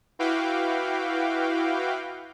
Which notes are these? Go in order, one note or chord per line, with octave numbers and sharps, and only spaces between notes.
E4 F#4 B4 F5 G5 D6